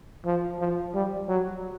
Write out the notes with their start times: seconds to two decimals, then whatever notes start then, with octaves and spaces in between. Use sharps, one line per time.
0.25 F3
0.59 F3
0.94 G3
1.28 F#3